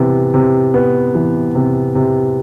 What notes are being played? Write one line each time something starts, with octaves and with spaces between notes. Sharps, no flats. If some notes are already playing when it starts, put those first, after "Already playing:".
Already playing: C3 E3 B3
C3
B3
E3
C3
C3